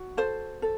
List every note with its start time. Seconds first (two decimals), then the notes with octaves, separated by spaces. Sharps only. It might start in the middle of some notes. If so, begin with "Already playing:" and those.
Already playing: F#4
0.17 A4 C5
0.62 A4